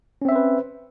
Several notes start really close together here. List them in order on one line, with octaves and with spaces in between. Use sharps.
C#4 C4 E5 C5 B4